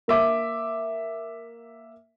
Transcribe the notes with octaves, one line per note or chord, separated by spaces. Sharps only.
A#3 E5 D6